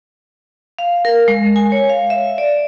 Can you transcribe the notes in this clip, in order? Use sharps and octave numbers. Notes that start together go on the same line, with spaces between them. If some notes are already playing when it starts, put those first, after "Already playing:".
F5
A#4
G#3
G#5
C#5
F5
E5
D5